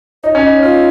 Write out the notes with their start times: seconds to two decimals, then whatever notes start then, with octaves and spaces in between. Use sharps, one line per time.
0.23 D#4 C#5
0.35 C#4
0.43 D#4
0.62 F4 C#5